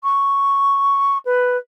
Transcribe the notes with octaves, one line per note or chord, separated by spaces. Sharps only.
C#6
B4